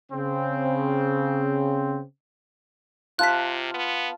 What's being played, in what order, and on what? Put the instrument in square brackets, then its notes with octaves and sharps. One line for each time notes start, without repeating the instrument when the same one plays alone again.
[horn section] C#3 C4
[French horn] C3 [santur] F4 A5 [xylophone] F#6 B6
[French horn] B3